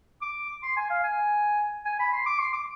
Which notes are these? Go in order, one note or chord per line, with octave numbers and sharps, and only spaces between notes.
D6
C6
G#5
F5
G#5
G#5
B5
C6
D6
C6
D6